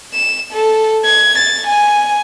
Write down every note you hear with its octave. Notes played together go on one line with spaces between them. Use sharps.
E7
A4
G#6
A6
G#5